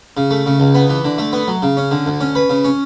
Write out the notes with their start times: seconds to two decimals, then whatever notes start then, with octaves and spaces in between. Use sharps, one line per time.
0.17 C#3
0.31 A3
0.46 C#3
0.60 C#2
0.75 B3
0.90 E3
1.05 D3
1.18 A3
1.33 B3
1.48 F#3
1.63 C#3
1.77 C#4
1.91 D3
2.06 D2
2.21 C#4
2.35 B4
2.50 C#3
2.65 C#4